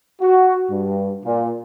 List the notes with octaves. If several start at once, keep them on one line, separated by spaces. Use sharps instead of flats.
F#4
G2
A#2